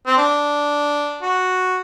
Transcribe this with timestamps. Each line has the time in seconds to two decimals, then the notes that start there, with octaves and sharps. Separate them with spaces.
0.07 C4
0.17 D4
1.22 F#4